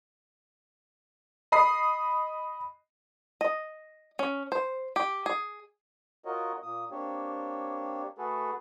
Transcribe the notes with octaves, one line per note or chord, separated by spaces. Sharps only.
D#5 B5 D#6 C7
D#5
C#4
C5
G4
G#4
F4 F#4 A#4 C#5 D#5
A#2 A#3 D#6
A#3 C4 D4 G4 C#5
A3 F#4 G#4 A4 B4